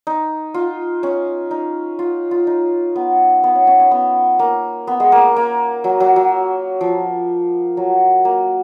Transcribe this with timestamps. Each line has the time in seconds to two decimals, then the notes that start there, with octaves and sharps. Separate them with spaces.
0.07 D#4
0.54 F4
1.03 C#4
1.51 D#4
1.99 F4
2.31 F4
2.47 D#4
2.96 B3
3.44 B3
3.55 C#4
3.67 C#4
3.80 C#4
3.91 B3
4.39 A#3
4.87 B3
5.00 G#3
5.12 A#3
5.36 A#3
5.84 F#3
6.00 F#3
6.16 F#3
6.81 F3
7.77 F#3
8.25 A#3